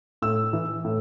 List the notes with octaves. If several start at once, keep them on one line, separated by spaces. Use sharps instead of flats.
A2 E6
E3
A2